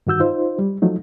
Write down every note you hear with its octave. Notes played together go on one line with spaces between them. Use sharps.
G2 D#3 F#4 E6 G6
D#4 F4 C5
G3
F3 F#3 A3 D#4